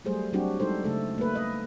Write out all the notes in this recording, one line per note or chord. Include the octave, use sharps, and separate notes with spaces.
F#3 G3 A3 G#4 C5
F#3 G3 C4 D4 F#4 G4
G3 G#3 D#4 A4 C5
C#3 A3 A4
A3 A#3 B4
D#5